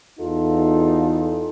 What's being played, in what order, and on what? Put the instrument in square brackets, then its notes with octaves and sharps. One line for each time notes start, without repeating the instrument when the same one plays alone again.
[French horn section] E2 D#4 F4 A4